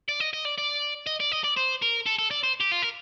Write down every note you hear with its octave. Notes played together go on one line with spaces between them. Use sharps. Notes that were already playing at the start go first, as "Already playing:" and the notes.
D5
D#5
D#5
D5
D5
D#5
D5
D#5
D5
C5
A#4
A4
A4
D5
C5
G4
F4
A#4